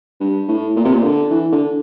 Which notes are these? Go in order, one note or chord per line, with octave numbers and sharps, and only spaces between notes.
G2
A2
A#2
C3
A#2
D3
E3
D3